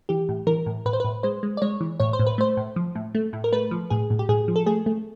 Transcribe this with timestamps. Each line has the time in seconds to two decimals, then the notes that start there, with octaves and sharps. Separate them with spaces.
0.09 E3 G4
0.29 A2
0.47 E3 A#4
0.66 A2
0.86 A2 B4
0.93 C5
1.00 A2 B4
1.23 G#3 C5
1.43 G#3
1.57 D5
1.62 G#3 C#5
1.81 E3
2.00 A2 C#5
2.13 C5
2.19 A2
2.27 B4
2.38 A3 C5
2.57 A2
2.76 F3
2.95 A2
3.15 A3
3.33 A2
3.44 A#4
3.52 A3 B4
3.71 F3
3.90 A2 G#4
4.10 A2
4.19 G4
4.29 A2 G#4
4.48 F3
4.56 A4
4.66 A3 G#4
4.86 A3